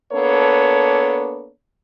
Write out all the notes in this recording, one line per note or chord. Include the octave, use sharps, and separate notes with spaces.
A#3 B3 D4 A4 B4 C#5